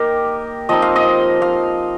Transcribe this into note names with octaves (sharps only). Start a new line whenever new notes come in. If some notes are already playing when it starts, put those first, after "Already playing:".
Already playing: A#3 D#4 G4 A#4 D#5
F3 C4 D#4 D#5
F5
D#5
F5